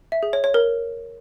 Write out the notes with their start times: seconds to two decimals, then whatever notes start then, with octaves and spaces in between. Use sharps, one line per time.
0.12 E5
0.23 G#4
0.33 C#5
0.44 C#5
0.54 A#4